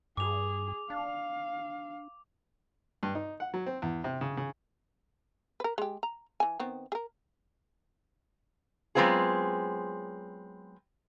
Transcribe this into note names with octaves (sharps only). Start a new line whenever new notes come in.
G2 G#4 D6 F7
D4 F5
G2
D#4
F#5
F#3
C4
E2
C3
C#3
C#3
A#4 B4
G#3 G4
A#5
E3 G#5
D#3 B3 C4
G#4 A#4
F#3 G#3 B3 C4 F4 G#4